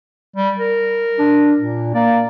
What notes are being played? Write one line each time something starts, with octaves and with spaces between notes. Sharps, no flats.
G3
A#4
D4
A#2
A#3 D5